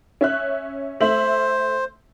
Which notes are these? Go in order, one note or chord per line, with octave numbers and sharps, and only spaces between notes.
C#4 E5 F#6
A3 C5 E5 F#7